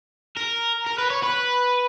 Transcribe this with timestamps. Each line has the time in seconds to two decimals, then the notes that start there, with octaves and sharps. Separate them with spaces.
0.37 A#4
0.87 A#4
0.98 B4
1.10 C#5
1.23 B4